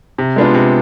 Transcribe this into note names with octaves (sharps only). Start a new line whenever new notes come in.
C3
G#3 B3 D4 F4
C3